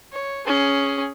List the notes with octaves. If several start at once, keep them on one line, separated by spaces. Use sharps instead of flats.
C#5
C#4 G#4